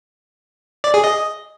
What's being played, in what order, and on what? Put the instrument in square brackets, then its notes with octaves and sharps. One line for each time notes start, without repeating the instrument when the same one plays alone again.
[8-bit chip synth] D5
G#4
D#5